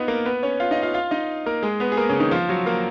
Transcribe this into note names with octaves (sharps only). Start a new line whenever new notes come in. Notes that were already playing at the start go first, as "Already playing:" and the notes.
Already playing: B3 D#4 F4 B4 D#5
A#3 A#4
B3 B4
C#4 C#5
F4 F5
D#4 D#5
F4 F5
F4 F5
D#4 D#5
A#3 A#4
G#3 G#4
B3 B4
G#4
A#3 A#4
C#3 C#4
D#3 D#4
F3 F4
F#3 F#4
A#3 A#4